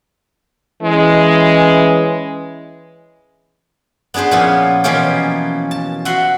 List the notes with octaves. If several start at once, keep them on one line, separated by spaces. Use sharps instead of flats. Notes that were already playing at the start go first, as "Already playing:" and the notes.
E3 G#3 C#4
B3 D4 G#4 B4 C5
A#2 F3 B3 C#4 E4
B2 E3 F3 A#3 C#4 G4
A5
F#4 E5 F#5 C6